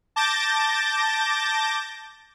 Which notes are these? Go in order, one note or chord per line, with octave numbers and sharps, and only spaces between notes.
A5 D6 G6 A6 A#6